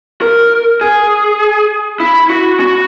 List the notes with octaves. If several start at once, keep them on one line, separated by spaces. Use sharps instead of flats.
A#4
G#4
E4
F#4
F#4